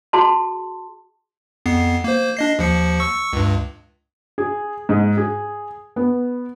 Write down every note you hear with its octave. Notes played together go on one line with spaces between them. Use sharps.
F#4 G#4 A5 C6
F2 B3 C7
A#3 C5
D4 D#5 C7
D#2 F3 C#7
C#6 E6 C#7
C#2 G2
G#4
G#2
G#4
B3